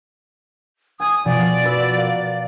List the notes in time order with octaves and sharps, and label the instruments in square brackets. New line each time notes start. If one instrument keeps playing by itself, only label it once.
[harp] G#5 G#6 [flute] D#6
[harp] B2 F3 G#5 [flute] D5
[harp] F#4 B4 E6
A#4 F5 A6